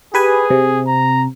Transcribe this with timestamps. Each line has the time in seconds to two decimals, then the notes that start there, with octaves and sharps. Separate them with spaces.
0.14 G4 G#4 B4 G#5
0.50 C3
0.87 A#5